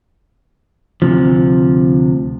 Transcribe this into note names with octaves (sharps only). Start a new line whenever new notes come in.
D2 C3 F3